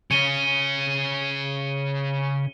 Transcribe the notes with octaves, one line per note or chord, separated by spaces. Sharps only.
C#3 C#4 C#7 D#7 G7